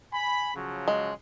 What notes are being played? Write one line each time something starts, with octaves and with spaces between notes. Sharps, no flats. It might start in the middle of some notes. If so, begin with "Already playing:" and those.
G#5 B5
C#3 F3 F#3
G#3